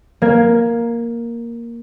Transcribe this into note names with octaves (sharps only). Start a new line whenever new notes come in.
A#3 G#6